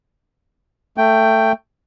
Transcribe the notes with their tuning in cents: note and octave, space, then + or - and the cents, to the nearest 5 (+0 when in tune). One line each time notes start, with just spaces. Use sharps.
A3 +15 G5 +0